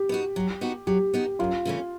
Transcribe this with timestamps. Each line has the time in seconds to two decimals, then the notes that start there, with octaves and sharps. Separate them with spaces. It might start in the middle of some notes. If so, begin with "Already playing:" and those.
Already playing: G4
0.09 B3 D#4 F#4
0.36 F#3
0.61 B3 D#4 F#4
0.87 F#3 G4
1.14 B3 D#4 F#4
1.39 F#2 F4
1.65 C#3 E3 A3 C#4